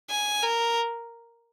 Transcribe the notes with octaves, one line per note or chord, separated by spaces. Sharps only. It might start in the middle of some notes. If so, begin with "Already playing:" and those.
G#5
A#4